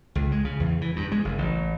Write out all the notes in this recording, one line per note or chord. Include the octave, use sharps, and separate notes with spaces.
C#2
G#3
C#3
E2
E3
G2
G#3
F#1
A1